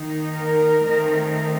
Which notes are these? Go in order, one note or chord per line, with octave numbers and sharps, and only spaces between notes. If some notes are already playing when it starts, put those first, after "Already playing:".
Already playing: D#3 A#3 D#4
A#4
D#3 A3 C4 D#4